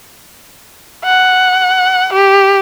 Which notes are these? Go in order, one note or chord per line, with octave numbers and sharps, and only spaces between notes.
F#5
G4